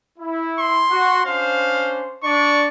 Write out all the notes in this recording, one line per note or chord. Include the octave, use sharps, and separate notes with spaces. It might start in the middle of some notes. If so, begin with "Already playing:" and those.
E4
C6
F#4
C#4 D4 C5 F5
D4 D5 C#6